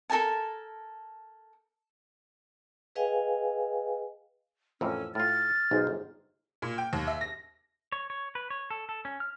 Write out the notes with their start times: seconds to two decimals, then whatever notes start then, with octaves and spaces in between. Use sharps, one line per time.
0.10 A4 A#4 G#5 A5
2.95 G#4 B4 D#5 F5 G5 G#5
4.81 F2 A2 E3 C#4 A#4 E6
5.15 A2 F4 F6 A6
5.71 B1 D#4 G#4 C5
5.87 G1
6.62 A#2
6.78 G5
6.93 D#2
7.07 E5
7.21 A#6
7.92 C#5
8.10 C#5
8.35 B4
8.50 C#5
8.70 A4
8.89 A4
9.05 C#4
9.20 F6